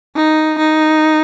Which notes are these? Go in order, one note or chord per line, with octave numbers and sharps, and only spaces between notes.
D#4
D#4